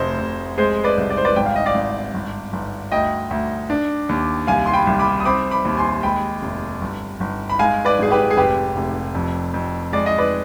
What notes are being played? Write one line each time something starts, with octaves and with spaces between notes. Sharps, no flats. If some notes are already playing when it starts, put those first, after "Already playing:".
Already playing: F1 D2 C5 D#5
F1
G#3 G#4 C5
B4 D5
C2
D5
C5
B4 D5
G#1 G5
F5
D#5
D5 F5
G#1
G1
G1
D2 D#5 G5
D2
D4
D#2
C2 F5 G#5
C6
G5 B5
C2
B5 D6
D#6
C4 B5 D6
B5 D6
D#2
G#5 C6
G#3 G5 B5
F1
G1
G1
B5
G#3 F5 G#5
B4 D5
G#1 G#4
G4 B4
G#4
F1 G4 B4
F1
F2
F2
G#3 D5
D#5
B4 D5